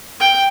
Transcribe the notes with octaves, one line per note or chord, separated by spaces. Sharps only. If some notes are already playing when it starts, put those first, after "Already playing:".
G5